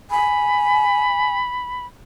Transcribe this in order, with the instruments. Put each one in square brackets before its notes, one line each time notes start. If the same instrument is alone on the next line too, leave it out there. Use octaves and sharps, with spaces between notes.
[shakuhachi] G#5 [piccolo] B5